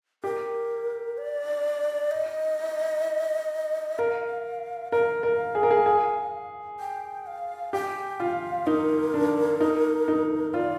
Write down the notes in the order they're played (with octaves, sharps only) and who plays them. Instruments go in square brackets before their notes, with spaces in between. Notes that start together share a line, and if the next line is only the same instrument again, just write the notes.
[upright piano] G4 [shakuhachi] A#4
[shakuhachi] D5
D#5
[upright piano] A#4 [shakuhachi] F5
[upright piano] A#4 [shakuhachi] F5
[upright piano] A#4
G#4
A#4
G#4
G#4
[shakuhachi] G5
F5
[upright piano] G4 [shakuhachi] G5
[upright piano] F4 [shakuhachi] F5
[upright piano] D#4 [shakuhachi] A#4
[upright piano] D4
D#4
D#4
[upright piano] F4 [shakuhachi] D5